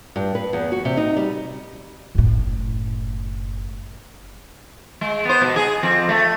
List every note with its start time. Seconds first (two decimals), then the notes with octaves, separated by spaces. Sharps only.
0.16 G2
0.35 B4
0.53 E2
0.72 F#4
0.85 C3
0.97 D#4
1.17 G3
2.15 F#1 A2
5.01 G#3
5.25 B3 C5
5.42 B2
5.56 G#4
5.83 F2 C4
6.09 A3